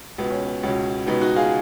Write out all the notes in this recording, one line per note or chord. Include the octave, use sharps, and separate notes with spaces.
C#2 B2 B3
C#4
B3
C#2 B2 C#4
C#2 B2 B3 D#4
D#4 F#4
F4 G#4